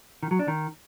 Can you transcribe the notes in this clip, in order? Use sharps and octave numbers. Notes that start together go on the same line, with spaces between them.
D#3
F#3
D4
D#3